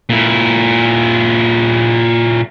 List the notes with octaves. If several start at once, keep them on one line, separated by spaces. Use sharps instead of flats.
A#2 E4